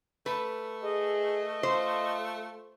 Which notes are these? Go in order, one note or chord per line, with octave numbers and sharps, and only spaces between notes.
A3 B4
G#4 D#5
F4 C5